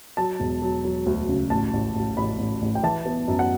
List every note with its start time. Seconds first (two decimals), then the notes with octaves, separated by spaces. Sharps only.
0.17 F#3 A5
0.40 E1
0.62 F#3
0.85 F#3
1.06 D2
1.29 C#3
1.50 A1 A5
1.73 A1
1.95 A1
2.17 A1 B5
2.39 A1
2.62 A1
2.75 G5
2.83 E3 A5
3.06 B3
3.28 F#2
3.39 F#5